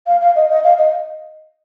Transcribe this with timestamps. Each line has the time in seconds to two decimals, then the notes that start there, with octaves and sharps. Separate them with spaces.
0.07 F5
0.21 F5
0.36 D#5
0.50 D#5
0.64 F5
0.78 D#5